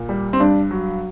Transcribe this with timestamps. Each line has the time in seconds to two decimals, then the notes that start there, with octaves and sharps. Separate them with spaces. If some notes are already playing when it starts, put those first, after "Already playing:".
Already playing: A#2
0.09 G3
0.33 C4
0.40 G2 D4
0.71 F#3